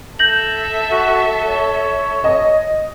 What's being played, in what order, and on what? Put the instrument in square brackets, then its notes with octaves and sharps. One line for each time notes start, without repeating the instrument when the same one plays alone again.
[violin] A4 E5 [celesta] G6 A#6 F#7
[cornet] F#4
C#5
[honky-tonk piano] D#5